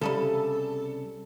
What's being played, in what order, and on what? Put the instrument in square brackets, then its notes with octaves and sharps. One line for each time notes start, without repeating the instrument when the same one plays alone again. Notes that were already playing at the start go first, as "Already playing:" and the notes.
[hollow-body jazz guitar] C2 C#3 G3 [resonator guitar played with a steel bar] A4